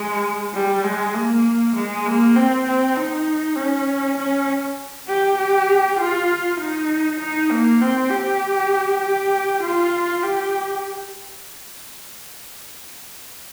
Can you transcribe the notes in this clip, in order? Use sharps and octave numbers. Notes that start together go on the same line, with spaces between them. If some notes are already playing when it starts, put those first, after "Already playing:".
Already playing: G#3
G3
G#3
A#3
G#3
A#3
C4
C4
D#4
C#4
C#4
G4
G4
F4
D#4
D#4
A#3
C4
G4
G4
F4
G4